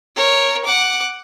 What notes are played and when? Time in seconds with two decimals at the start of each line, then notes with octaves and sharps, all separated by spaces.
0.16 A#4 C#5
0.65 F#5 D6